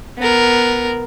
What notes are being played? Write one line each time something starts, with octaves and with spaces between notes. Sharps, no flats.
B3 A#4